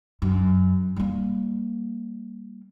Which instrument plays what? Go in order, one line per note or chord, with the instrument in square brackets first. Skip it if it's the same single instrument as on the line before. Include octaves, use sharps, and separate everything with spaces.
[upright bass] F#2
G3 A#3